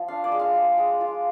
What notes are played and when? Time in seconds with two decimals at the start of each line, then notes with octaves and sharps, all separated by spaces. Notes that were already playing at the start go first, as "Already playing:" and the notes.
Already playing: F3 F4
0.08 D4 F5
0.24 D5
0.32 G#3
0.39 F5
0.55 G#3
0.78 G#3
1.01 F4